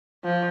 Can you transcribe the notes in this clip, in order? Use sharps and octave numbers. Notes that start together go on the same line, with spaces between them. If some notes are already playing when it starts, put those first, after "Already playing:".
F3